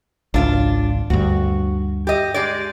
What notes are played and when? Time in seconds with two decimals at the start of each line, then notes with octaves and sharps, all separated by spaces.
0.34 G#1 C#2 D4 F4
1.10 D2 G2 F#4
2.07 G4 D#5
2.34 G#3 G4 D5